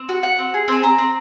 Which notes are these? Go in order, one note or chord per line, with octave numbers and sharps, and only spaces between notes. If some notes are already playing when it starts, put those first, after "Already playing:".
Already playing: C4
F#4
F#4 F#5
C4
G#4
C4 G#5
C4 A#5
C4